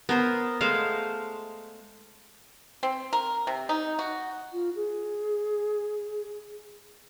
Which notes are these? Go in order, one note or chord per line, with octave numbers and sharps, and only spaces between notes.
B3 A#4 C5
G#3 A3 C5 F5
C4
A#4
C3
D#4
F#4
F4
G#4